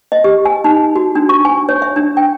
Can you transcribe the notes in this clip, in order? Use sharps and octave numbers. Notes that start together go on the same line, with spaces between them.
D#5
G4
G#5
D#4
F#4
D4
C#6
G#5
C#5
E5
D4
G5